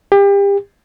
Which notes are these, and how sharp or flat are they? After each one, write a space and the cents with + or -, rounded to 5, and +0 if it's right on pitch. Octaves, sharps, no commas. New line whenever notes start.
G4 +30